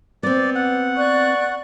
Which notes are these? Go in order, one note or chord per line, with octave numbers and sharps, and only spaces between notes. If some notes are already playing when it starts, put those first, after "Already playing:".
B3 C4 D5
F#5
D5 C#6 F#6